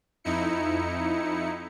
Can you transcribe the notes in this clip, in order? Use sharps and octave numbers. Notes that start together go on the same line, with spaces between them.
F2 D#4 E4 C#7